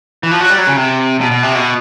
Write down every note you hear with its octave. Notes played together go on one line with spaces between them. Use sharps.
E3
F3
F#3
G3
F#3
C#3
C3
B2
B2
C3
B2